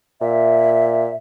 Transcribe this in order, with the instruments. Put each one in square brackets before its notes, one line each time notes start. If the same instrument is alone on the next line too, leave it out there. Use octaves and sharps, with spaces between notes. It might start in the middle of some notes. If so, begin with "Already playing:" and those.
[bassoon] A#2 [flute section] E5